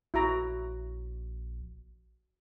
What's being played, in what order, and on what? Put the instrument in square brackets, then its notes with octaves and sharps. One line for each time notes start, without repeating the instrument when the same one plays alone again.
[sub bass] A#1 [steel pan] E4 F#4 A#5